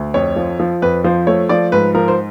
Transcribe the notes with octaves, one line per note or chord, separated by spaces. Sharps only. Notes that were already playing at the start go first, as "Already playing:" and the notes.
Already playing: D2
F2 C#5
F3
F3
F2 B4
F3 C5
A3 C#5
F3 D5
G#2 B4
F3 A#4
C5